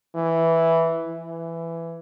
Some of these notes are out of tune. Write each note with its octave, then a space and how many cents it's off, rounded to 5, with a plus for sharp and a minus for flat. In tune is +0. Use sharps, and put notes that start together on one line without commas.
E3 +0
E3 +15